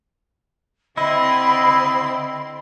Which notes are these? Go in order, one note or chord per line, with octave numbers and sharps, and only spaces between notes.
D3 C4 E4 D#5 B5 C6